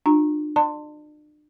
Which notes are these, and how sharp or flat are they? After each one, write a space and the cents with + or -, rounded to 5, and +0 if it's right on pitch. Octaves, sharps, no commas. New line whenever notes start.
D4 +40 F4 +35 A#5 +0
D5 +40 A5 +30 C6 +0